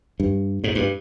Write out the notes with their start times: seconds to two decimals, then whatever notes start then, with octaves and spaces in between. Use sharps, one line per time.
0.20 G2
0.64 G#2
0.75 G2